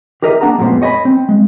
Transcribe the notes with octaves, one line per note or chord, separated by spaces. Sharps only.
G4 G#4 A#4 B4 D#5 E5
A#3 D4 F#5 A5 A#5
F2 A#2 F3 G#3 B3 C5
C#5 D#5 G#5 A#5 B5
C4
G#3